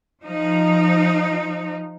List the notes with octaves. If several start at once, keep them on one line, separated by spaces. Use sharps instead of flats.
F3 D#4